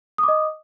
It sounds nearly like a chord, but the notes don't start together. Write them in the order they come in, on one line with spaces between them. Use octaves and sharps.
D#6 D6 D#5